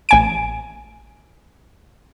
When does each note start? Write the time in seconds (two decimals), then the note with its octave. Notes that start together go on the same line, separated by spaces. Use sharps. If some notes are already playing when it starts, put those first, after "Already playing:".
0.09 A1 G#5 D7